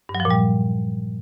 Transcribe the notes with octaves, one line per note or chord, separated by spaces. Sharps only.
G2
F#3
F3
A#2
G3